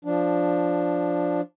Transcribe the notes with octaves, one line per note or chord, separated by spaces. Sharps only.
F3 D4